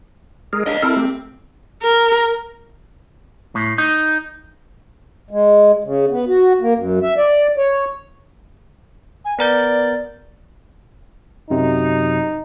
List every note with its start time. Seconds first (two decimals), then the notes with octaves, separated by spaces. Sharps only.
0.53 G#3 G#4 A#4
0.66 D4 A#4 D#5 F5
0.82 C4 E4 A4 A#4
0.96 A3 G4
1.82 A#4
3.55 A2
3.78 D#4
5.31 G#3
5.84 C#3
6.11 B3
6.28 F#4
6.61 A#3
6.75 F#2
7.02 E5
7.17 D5
7.57 C#5
9.25 G#5
9.39 B3 A#4 D5 G6
11.50 F#2 C3 F#3 D#4